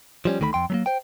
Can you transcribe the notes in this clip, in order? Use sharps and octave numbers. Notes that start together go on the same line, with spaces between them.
F3 G3 C#4
D2 D#3 A3 B4 B5
F2 G5 C6
F#3 A3 A#3
C5 G5